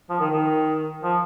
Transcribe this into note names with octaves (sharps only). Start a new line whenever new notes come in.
F3
D#3
D#3
F3